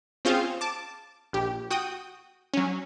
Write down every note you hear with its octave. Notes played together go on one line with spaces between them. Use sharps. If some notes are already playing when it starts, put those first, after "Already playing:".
C4 C#4 F4 G#4 C5 F5
A5 D6
A#1 G4
F#4 G5 D#6
F#3 C#4